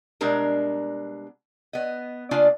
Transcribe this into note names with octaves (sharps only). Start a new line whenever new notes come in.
B2 G3 G#3 D4 A#4 A#5
B3 D#5
C#3 A#3 D4 F4 D5 G#5